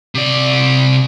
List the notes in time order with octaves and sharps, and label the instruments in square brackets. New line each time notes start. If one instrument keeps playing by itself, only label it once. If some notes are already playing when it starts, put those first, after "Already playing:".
[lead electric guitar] C3 D5